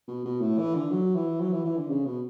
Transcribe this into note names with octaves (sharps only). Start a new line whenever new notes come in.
B2
B2
A2
E3
D3
F#3
E3
F#3
E3
E3
D3
C#3
B2